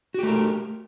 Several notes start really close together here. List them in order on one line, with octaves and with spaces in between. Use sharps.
F#4 G4 A3 A#4